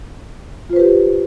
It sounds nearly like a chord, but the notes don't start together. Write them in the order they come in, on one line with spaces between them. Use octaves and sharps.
F4 C5 B4 G4